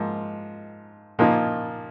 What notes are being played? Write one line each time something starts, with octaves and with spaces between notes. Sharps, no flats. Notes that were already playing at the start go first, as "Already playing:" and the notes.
Already playing: G#2 F3 A#3
A#2 F3 A#3 D#4